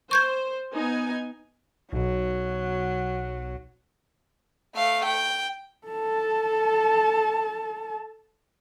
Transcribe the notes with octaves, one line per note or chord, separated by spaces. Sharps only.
C5 C#6 G6 G#6
B3 D#4 G#5
B1 B2 F#3
A3 F5
G5
A4 A5